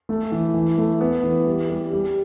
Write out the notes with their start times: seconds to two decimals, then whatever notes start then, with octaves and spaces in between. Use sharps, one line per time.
0.09 A3
0.32 E3
0.54 E3
0.78 A3
1.01 B3
1.23 E3
1.47 G3
1.69 G3
1.93 G3